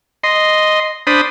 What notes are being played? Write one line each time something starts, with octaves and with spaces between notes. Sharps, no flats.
D#5 C6
D4 C5 B5 D#6